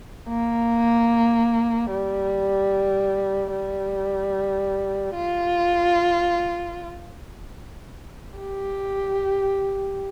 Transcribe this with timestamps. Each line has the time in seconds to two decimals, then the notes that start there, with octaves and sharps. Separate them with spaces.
0.29 A#3
1.90 G3
3.52 G3
5.14 F4
8.38 G4